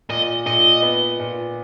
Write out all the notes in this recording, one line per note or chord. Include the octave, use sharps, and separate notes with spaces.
A#2 D#5
A#2 D#5
B3
A#2